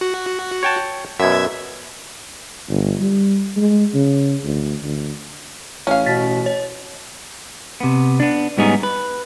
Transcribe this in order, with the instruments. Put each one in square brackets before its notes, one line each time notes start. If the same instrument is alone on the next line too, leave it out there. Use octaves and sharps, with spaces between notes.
[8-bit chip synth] F#4
[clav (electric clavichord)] C#5 G5 A5
[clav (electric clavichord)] F#2 B2 [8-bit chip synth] E5 G#6
[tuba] G1
G3
G#3
C#3
D2
D2
[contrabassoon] A1 [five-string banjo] C#4 F5
[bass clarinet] B2 [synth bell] A6 B6
[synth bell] C#5
[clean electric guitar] C3 B3
B3 D4
G#2 G3 B3 C#4 D#4 G#4
B4